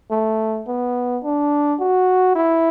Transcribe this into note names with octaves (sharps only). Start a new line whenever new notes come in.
A3
B3
D4
F#4
E4